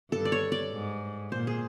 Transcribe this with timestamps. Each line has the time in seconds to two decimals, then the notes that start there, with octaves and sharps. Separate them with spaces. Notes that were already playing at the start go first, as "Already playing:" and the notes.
0.12 G2 A4
0.25 D5
0.32 C#5
0.52 D5
0.72 G#2
1.31 A#2 C5
1.47 G#4